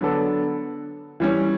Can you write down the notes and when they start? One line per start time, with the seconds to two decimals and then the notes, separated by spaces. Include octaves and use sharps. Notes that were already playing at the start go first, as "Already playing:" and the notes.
0.01 D3 F#3 B3 D4 A4
1.20 E3 G3 C#4